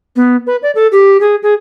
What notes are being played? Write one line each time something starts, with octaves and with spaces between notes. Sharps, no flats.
B3
B4
D5
A4
G4
G#4
G#4